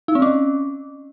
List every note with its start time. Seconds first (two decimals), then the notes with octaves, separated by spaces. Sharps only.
0.08 D#4
0.15 C4
0.22 C#4